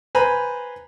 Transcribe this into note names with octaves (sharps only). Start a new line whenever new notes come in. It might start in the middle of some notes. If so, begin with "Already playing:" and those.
B4 C5 G#5 A#5 B5